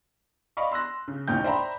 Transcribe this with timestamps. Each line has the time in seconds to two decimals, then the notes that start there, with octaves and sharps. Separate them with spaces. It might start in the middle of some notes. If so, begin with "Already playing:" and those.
0.57 D5 D#5 F5 B5 C#6
0.71 C6 E6 F#6 A#6
1.08 C#3
1.28 A1 D#2 A#2 C#4 G5 G6
1.44 C5 D5 E5 G5 A#5 B5